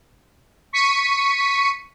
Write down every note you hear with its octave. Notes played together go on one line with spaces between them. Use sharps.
C#6 B6 C#7 D#7